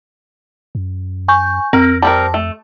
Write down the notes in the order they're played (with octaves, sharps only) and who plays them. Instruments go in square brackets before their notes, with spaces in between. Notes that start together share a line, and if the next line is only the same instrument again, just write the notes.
[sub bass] F#2
[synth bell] G#5 C#6 G6
[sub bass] F2 [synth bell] C4 [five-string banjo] A#4
[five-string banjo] G3 C4 A#4 [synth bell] A5
[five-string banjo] A3